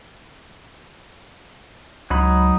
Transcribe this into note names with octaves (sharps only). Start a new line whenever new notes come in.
C#2 F#3 D#4 B5